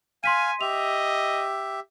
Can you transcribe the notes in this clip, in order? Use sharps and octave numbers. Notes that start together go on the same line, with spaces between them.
F5 G#5 C6 B6 D#7
G4 D#5 E5 F7